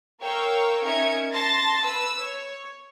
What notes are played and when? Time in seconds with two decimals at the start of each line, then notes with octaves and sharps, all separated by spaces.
0.21 A#4 C#5 F5 G5 C#6 E6
0.83 C#4 D#4 A#4 E5 G#6 C#7
1.32 A5 C6 A6 A#6
1.83 B4 E6
2.20 C#5